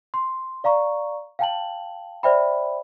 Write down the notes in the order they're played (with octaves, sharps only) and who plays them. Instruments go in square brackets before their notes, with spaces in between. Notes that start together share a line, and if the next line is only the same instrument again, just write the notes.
[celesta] C6
D5 F5 A#5 C#6
F5 G5 A5 F#7
C5 D5 E5 G5 B5